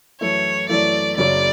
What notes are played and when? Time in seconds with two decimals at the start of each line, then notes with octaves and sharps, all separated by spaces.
0.21 F#2 E3 A3 E4 C#5
0.69 F#2 E3 A3 E4 D5
1.18 F#1 F#2 C#3 F#3 C#4 D5